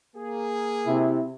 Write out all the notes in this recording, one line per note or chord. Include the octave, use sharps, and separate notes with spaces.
A#3 G#4
C3 E4